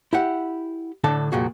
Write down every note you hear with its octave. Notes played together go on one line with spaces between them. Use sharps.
E4 G4 F#5
A2 D3 D4 A4 A5
C2 F2 A#2 F#4 G#4